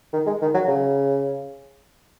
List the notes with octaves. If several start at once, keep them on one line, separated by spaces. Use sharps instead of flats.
D#3
G#3
D#3
F#3
C#3